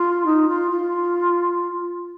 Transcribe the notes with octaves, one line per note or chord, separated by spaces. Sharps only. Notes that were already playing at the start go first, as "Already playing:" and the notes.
Already playing: F4
D#4
F4
F4